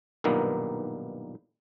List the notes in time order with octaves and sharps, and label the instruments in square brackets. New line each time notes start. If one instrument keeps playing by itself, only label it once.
[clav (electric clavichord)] B1 G2 A#2 D#3 A#3 B3